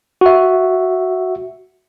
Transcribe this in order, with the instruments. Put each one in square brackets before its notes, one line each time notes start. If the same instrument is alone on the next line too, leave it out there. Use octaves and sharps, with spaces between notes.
[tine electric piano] F#4 E5